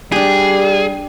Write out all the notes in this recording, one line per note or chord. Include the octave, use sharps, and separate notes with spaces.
G3 D4 G4 G#4